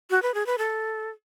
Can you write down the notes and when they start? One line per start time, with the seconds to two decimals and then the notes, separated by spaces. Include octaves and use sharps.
0.10 F#4
0.22 B4
0.34 G#4
0.46 B4
0.58 A4